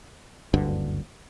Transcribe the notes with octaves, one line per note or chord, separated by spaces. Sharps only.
F#1 D2 G2 D3